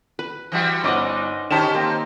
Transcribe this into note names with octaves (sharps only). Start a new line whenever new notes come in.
B4
E3 G3 F#4
G1 C#4 D#4 C5 F#5 D6
D#3 C#4 D#4 G4 C5 A5 E7
A#3 C4